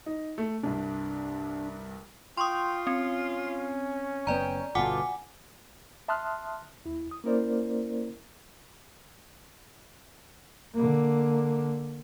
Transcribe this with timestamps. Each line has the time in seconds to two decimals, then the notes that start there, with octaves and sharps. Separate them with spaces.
0.06 D#4
0.38 A3
0.63 C2 G2 D4
2.37 F4 G5 C6 C#6 D#6
2.87 C4 C#4
4.27 F#1 B3 D5 G5 A#5
4.75 G1 B2 F4 A4 F#5 G#5 D6
6.08 E5 A5 C6 D#6 F6 F#6
6.85 D#2 E4
7.11 D#6
7.24 A#3 C#4 E4 A#4 C5 D5
10.75 D3 A#3